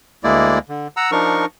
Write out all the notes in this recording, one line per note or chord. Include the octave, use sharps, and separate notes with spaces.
D2 G#3 A#3 E4 D5
D3
F#5 A#5 E6
F3 D4 D#4 A#4 C#6